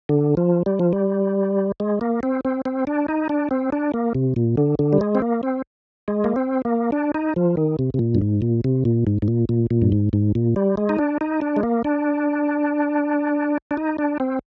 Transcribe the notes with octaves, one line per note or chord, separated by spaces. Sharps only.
D3
F3
G3
F3
G3
G#3
A#3
C4
C4
C4
D4
D#4
D4
C4
D4
A#3
C3
A#2
D3
D3
G3
G#3
C4
A#3
C4
G#3
A#3
C4
A#3
D4
D#4
F3
D#3
C3
C3
A#2
G2
G#2
A#2
C3
A#2
G#2
G#2
A#2
A#2
A#2
G2
G#2
G#2
A#2
G3
G#3
D#4
D4
D#4
D4
G#3
A#3
D4
D4
D#4
D4
C4